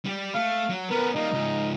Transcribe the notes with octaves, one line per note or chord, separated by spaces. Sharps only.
G3 G4
A3 F5
F#3
B3 C#4 A#4 B4
G3 A#3 D#4
C#2 G#2